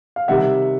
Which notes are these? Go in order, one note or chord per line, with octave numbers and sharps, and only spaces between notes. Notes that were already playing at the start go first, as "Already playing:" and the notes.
F5
C3 D#3 G3 E5 F#5